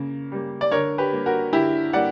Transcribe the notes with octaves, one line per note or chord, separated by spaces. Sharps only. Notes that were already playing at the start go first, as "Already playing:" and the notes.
Already playing: C#3 A#3
G3 A#3
D5
D3 A#4 C#5
G4 B4
G3 A#3
F#4 A#4
D3 E4 G4
G3 A#3 D5 F#5